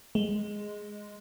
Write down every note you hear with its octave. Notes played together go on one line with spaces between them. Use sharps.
G#3